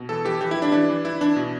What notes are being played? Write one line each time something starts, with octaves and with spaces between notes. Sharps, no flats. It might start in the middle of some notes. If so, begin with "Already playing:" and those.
Already playing: B2
E3 A4
E3 G4
E3 G4
E4
E3
D4
E3 D4
E3
E3 E4
E3 D4
B2